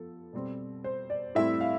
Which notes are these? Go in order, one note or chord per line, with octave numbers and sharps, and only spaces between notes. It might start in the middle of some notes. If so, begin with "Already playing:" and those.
Already playing: F3 B3 A4
B2 G3 C4
C5
D5
A2 G3 C4 E4 E5
F5